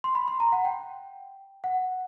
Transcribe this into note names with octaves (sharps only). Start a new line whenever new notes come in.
C6
B5
C6
A#5
F#5
G5
F#5